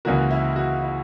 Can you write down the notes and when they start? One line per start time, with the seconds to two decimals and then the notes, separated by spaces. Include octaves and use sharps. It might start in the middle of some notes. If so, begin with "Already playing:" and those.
0.05 C#2 C#3 E3 A#3 F#4
0.31 E4
0.56 F#4
0.82 E4